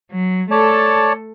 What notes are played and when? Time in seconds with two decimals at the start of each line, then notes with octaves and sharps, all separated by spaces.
0.12 F#3
0.51 A3 A4 C#5 D5 A5